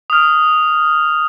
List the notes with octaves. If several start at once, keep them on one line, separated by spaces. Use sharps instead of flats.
D#6 F6